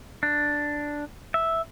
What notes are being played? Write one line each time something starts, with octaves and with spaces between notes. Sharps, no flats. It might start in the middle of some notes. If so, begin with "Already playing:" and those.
D4
E5